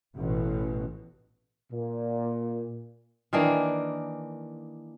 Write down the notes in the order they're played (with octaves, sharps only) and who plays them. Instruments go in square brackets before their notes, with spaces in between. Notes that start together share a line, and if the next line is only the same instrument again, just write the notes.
[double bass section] A1 B2
[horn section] A#2
[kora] D#3 E3 A#3 D4